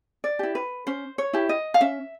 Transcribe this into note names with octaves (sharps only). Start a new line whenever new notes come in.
D5
E4 G4
B4
C#4 C5
C#5
E4 G4
D#5
F5
C#4 E5